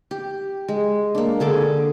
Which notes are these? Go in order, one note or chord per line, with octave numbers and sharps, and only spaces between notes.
G4
G#3
A#3 D4
D3 G#4 A4 D6